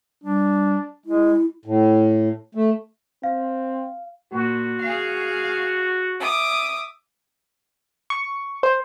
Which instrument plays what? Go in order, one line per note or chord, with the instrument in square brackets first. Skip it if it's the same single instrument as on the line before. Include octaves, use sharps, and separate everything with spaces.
[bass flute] G3 [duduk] D4
[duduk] G#3 [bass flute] E4
[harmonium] A2
A3
[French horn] C4 [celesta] F5
[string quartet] A#2 [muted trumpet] F#4
[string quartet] G#4 F5
E5 D6 D#6
[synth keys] C#6
C5